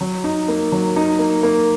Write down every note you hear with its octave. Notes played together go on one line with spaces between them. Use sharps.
F#3
D#4
A#3
F#3
D#4
A#3
A#3